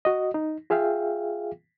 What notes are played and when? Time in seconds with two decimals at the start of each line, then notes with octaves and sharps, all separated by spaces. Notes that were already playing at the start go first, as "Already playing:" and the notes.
0.05 F#4 D#5
0.34 D#4
0.70 F4 G#4 E5 F5 G5